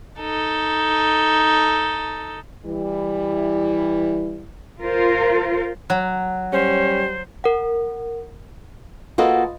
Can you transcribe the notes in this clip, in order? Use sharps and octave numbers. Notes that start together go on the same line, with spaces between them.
D#4 A4
E3 G3 E4
F4 A#4 C5
F#3
G3 C#4 C5
A#4 F#5
A#3 F4 F#4 A4 B4 D#5